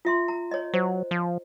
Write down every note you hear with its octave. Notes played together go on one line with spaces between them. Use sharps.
F4 E5 C6
A#5
C#5 D#5
F#3 C5
F3